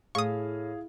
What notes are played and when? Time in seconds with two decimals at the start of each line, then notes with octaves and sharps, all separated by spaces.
0.15 A2 G#4 F5 C#6 D#6